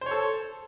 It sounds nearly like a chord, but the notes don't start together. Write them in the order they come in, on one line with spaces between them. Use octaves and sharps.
C5 C#5 A4